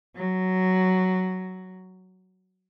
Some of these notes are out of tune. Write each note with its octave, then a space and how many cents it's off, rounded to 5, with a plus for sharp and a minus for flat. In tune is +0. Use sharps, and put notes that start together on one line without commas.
F#3 +5